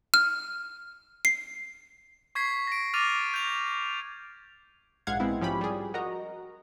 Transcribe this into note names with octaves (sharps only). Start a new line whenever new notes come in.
F6
C7
C#6 G#6 B6 C7
A#6 D7
D6 F6 A6 A#6 D#7 F7
G6 F7
A#1 G#2 F5 F#5 G#6
G#3 B3 C4 E4
G#2 F3 C#4 G4 B5
G3 G#4
F#4 A#4 D#5 A#5